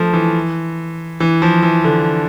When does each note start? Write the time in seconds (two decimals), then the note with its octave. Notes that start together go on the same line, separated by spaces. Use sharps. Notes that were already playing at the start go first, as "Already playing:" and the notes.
Already playing: F3 A3
0.13 E3
1.20 E3
1.42 F3
1.63 E3
1.84 D3